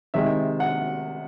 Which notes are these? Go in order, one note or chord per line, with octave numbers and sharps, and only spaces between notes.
C3 D#3 G#3 E5
F#5